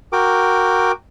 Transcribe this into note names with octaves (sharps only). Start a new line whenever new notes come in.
F#4 A#4 G5 D6